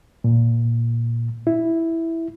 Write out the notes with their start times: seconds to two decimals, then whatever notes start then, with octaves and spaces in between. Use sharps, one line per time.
0.24 A#2
1.47 E4